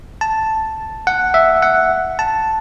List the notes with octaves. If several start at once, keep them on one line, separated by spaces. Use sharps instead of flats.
A5
F#5
E5
F#5
A5